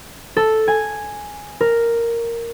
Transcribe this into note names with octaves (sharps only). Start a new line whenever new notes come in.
A4
G#5
A#4